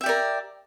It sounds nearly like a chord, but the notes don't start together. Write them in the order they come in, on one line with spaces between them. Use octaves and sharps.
E5 G4 D5 A#4